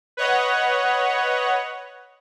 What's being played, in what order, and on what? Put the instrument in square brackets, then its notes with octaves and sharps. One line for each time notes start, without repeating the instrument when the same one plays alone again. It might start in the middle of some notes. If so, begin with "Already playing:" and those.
[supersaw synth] B4 C#5 D#5 F#5